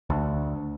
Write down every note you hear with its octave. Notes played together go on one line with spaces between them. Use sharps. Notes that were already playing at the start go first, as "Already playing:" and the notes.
D2